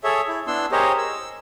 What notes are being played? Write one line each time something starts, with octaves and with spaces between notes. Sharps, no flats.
G#4 A4 C#5 E5
E4
B3 D4 E4 C6 E6
G4 G#4 A#4 C5 C#5 D#5
E6